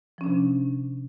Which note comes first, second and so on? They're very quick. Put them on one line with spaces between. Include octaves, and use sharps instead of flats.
F3 C#4 D4 C3